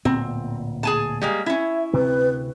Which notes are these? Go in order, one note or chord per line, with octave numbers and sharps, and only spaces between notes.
D1 A#2 B3 C4
G#4 G#5 A5
G3 G#3 A#3
C#4 E4 E5
D2 C3 C4 B4